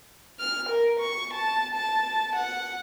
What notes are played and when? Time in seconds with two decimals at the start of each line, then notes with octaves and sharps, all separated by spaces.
0.40 F6
0.69 A#4
1.00 C#6
1.34 A5
1.75 A5
2.35 F#5